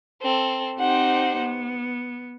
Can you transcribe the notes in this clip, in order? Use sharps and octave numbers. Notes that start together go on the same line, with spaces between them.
C4 A4
C4 D#4 G4 C5 F#5
B3